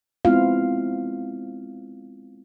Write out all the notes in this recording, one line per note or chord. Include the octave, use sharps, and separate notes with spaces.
G#3 B3 C4 E4 F4 F5